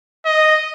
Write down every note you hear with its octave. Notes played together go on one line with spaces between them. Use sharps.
D#5